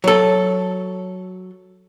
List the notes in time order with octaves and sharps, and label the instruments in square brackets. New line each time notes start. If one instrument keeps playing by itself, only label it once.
[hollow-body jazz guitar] F#3 A4